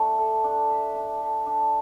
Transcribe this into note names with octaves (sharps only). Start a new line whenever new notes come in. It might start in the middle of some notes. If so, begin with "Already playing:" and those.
Already playing: A3 D4
A4
D4
E5
D4
A4
D4